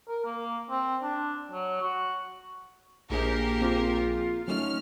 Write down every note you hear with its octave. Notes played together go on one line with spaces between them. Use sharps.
A#4
A#3
C4
D4
F#3
F#4
A#1 A#3 G4 G#4 A#4
C4 F4
F#3 A3 C#4 D#4 F6